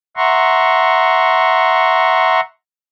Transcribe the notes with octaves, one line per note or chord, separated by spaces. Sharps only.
E5 F#5 A#5 C6 C#6